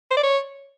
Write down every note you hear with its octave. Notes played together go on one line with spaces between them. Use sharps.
C5
D5
C#5